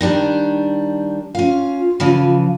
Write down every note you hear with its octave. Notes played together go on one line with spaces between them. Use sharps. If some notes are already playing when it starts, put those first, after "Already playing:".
D#3 G3 D4
C#4 F4 F5
C#3 E3 F3